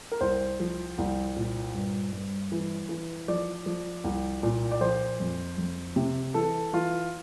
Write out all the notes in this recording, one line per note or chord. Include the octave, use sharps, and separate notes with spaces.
A#4
C2 C5
F3
C2
A#2
G2
G2
E3
E3
F3 D5
F3
C2
A#2
D5
F3 C5
F2
F2
C3
E3 A4
E3 F4